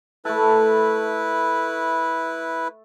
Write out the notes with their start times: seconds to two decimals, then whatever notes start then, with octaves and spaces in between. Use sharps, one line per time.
0.25 A3 E4 A4 B4